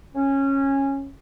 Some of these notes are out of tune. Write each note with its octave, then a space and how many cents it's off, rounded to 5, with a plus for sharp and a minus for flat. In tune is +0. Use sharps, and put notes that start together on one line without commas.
C#4 -15